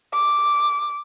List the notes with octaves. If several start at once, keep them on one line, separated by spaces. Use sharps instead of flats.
D6